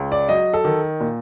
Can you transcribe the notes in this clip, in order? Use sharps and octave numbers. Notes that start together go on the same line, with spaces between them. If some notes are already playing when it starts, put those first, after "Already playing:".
Already playing: C#2
D5
F#3 D#5
A4
D#3
A#2